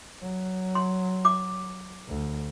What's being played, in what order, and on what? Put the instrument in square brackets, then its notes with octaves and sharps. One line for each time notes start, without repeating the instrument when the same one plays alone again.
[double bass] F#3
[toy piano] C6
D6
[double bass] D2